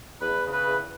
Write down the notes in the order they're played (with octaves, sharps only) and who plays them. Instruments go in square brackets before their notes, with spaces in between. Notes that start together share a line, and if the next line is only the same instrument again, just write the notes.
[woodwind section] E2 B4
C#3
B4
E2